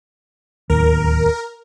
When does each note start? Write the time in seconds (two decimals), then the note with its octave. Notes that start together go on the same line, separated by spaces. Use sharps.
0.70 D1 D#2 A#4